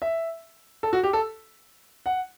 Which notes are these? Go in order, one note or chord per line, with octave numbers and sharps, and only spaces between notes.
E5
A4
F#4
G4
A4
F#5